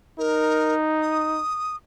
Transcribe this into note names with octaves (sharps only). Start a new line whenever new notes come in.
D#4 A#4
D#6